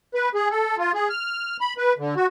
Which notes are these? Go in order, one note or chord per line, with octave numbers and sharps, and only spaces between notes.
B4
G#4
A4
F4
G#4
F6
B5
B4
D3
F#4